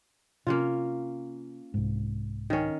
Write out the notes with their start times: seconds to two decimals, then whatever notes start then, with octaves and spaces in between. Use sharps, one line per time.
0.47 C3 A#3 C#4 F4
1.74 C2 G#2
2.50 D#3 C#4